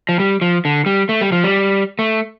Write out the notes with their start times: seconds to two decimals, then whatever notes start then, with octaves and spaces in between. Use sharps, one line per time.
0.09 F3
0.20 G3
0.41 F3
0.65 D3
0.86 G3
1.09 A3
1.21 G3
1.32 F3
1.44 G3
1.99 A3